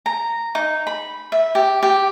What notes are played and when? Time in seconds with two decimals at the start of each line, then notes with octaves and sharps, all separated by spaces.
0.06 A#5
0.55 D#4
0.87 B5
1.32 E5
1.55 G4
1.83 G4